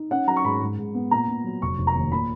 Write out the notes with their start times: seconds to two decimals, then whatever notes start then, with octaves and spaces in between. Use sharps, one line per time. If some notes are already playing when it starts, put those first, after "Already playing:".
Already playing: D#4
0.11 C#4 F#5
0.27 F#3 A#5
0.36 C#6
0.44 G#2 B5
0.61 G#2
0.78 G#2
0.95 B3
1.11 A#2 A#5
1.28 A#2
1.44 F#3
1.62 F1 C#6
1.78 F1
1.87 A#5
1.95 D#2
2.12 A#2 B5